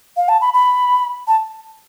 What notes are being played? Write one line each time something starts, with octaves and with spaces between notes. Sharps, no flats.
F5
A5
B5
B5
A5